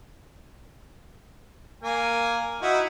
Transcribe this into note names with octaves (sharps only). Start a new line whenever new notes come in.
A#3 G#5
D#4 E4 F#4